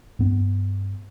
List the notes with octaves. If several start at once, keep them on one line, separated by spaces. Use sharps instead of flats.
G2 B3